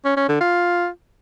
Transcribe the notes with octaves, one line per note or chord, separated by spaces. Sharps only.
C#4
C#4
D3
F4